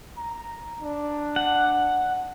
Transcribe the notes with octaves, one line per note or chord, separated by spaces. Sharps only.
A#5
D4
F#5